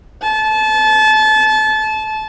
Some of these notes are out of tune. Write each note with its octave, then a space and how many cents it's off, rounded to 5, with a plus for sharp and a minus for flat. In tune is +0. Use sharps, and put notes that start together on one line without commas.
A5 -25